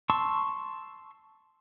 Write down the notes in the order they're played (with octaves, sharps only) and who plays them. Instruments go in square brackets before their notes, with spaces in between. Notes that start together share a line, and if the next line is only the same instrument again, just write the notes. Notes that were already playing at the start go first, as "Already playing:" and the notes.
[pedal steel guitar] A5 C6 C#6 E6